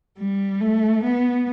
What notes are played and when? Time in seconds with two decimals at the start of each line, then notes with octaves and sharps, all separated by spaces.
0.18 G3
0.61 A3
1.04 B3